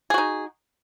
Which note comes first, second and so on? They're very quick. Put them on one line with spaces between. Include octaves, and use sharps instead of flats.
G#4 F#4 D#4